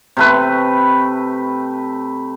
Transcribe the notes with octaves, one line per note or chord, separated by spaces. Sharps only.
C3 A3 B4